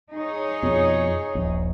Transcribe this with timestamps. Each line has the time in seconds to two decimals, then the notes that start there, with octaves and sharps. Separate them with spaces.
0.14 D#4 G#4 C#5
0.63 F2 B2 F3
1.35 D#1 A#1